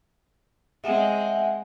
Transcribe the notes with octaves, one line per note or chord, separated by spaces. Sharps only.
G#3 C4 E5 F#5 G#5